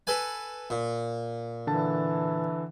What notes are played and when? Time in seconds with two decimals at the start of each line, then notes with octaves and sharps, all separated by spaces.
0.07 A4 B4 G#5
0.70 A#2
1.67 D3 E3 A5